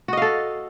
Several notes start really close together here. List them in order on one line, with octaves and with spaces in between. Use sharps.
F#4 D#5 F5 A4